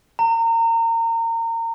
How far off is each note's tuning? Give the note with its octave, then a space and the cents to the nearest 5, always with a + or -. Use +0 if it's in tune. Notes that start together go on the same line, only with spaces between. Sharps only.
A#5 -30